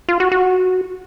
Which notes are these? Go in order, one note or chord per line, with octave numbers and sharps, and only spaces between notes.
F4
F#4
F#4